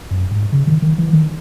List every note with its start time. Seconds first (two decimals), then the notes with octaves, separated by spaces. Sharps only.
0.11 F#2
0.31 G#2
0.52 C#3
0.67 D#3
0.82 D#3
0.98 E3
1.13 D#3